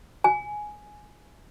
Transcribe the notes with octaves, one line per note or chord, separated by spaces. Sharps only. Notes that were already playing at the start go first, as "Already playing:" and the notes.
G#5